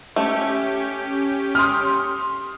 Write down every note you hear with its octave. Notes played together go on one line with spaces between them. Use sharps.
A3 C#4 G4
C6 D#6 F6